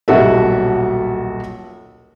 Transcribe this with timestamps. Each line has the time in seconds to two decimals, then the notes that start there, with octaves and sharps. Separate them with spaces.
0.08 D#1 B1 F#4 A4 E5